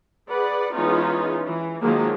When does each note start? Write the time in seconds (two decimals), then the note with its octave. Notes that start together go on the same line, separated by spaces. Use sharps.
0.30 G#4 B4 D5 F#5
0.75 E3 G#3 B3 C#4 D#4 F4
1.46 E3
1.81 D#3 F3 F#3 G#3 A#3